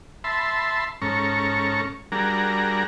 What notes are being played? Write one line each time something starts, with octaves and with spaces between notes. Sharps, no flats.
E5 A5 B5 C6
G#2 C#4 A4 A#5 C#6
G3 D4 F#4 G#4 A#4 A#5